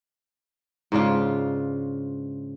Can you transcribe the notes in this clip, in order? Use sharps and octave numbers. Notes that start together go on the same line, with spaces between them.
G#2 C#3 D4 F4